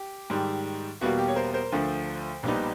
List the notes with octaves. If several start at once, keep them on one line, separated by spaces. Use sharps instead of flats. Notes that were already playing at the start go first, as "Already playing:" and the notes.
Already playing: G4
G#2 D#3 G3
E2 B2 G3 A#3 F#4
G4
C#5
A#4 C5
A#4 C5
D2 D3 F3 A3
A#1 A#2 G3 B3 D#4